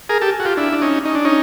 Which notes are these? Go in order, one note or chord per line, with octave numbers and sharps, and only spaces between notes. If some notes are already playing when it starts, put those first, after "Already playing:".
G#4 A#4
G4 A4
F#4
F4 G4
D4 E4
D4
C#4 D#4
D#4
D4
C#4 D#4